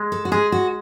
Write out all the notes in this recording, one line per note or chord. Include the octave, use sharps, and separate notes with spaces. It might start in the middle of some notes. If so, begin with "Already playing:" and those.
Already playing: G#3
A4
F#4
G#3 G#4
F#4